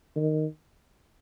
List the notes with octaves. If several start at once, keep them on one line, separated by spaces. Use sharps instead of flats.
D#3